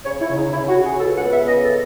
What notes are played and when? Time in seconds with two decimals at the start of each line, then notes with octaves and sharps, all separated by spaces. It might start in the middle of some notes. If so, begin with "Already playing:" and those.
0.05 C#3 C#5
0.21 E4
0.29 C#3
0.36 D#4
0.52 C#3 E4
0.69 F#4
0.76 C#3
0.85 G#4
1.00 C#2 A4
1.16 F#5
1.24 B3
1.31 E5
1.48 C#3 D#5
1.64 A4